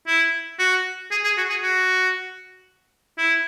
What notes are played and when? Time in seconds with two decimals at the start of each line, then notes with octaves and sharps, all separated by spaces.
0.07 E4
0.59 F#4
1.11 G#4
1.24 G#4
1.37 F#4
1.50 G#4
1.63 F#4
3.18 E4